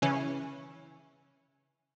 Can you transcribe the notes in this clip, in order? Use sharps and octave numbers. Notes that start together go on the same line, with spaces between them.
C#3 E3 C#4